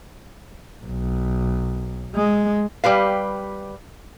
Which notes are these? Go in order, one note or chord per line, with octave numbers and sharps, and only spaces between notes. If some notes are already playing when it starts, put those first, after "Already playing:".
B1
G#3
G3 G4 B4 F5